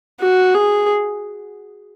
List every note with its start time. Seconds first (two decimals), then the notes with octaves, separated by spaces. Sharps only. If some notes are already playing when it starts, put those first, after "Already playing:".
0.20 F#4
0.55 G#4